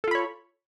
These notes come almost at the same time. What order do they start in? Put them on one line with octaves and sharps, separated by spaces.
A4 F4 B5 C#5